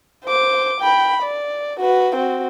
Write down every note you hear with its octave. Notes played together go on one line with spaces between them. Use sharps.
C5 D6
G5 B5
D5
F#4 B4
C4 F#4